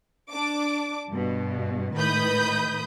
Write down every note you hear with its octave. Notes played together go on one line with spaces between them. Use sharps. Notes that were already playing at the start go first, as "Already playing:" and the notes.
D4 D6
G2 B2
A2 D#3 B4 B5 D#6 G6